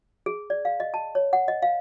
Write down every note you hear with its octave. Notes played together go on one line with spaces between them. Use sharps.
G#4
D5
F5
D#5
A5
C#5
F#5
D#5
F5